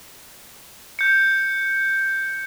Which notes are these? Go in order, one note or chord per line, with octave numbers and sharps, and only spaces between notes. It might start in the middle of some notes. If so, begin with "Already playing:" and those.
G6 C#7